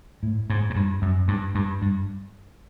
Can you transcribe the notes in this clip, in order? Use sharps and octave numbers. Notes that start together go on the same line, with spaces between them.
A2
G#2
G#2
G2
F#2
G2
G2
G2